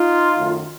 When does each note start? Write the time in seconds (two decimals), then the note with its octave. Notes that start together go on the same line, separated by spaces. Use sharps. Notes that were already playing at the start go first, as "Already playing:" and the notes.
Already playing: D#4 F4
0.37 F#2 D#3 F#3 A3